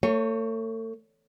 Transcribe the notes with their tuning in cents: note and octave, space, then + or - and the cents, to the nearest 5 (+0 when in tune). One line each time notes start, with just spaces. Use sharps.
A3 +40 C#5 +0